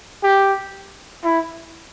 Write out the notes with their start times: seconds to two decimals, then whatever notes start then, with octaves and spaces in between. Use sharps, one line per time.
0.23 G4
1.24 E4